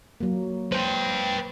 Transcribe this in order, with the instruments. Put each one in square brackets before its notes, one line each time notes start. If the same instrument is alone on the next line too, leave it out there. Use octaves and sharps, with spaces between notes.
[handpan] F#3 A#3
[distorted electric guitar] B4 G5 [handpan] C5